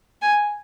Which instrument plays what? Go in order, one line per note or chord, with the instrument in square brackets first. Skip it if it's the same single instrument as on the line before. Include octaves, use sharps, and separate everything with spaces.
[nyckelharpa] G#5